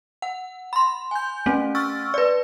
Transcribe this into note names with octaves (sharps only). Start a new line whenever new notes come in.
F#5
B5 C6
G#5 G6
A3 C4 C#4
C#6 E6 F6 A6
B4 D5